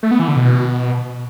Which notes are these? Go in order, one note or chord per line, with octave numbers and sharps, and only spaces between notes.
A3
B3
E3
D3
B2